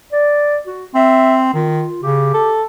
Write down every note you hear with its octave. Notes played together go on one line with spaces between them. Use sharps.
D5
F#4
C4 E5
D#3 F4
C#3 G4
A4